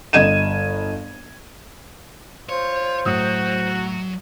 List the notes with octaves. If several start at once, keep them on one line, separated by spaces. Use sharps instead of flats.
G1 D#5 G#6 D#7 E7
F4 C5 C#5
A2 F#3 F#4 D#6